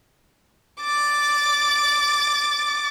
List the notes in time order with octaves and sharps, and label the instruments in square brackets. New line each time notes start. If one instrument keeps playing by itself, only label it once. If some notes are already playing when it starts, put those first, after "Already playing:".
[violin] D6 A6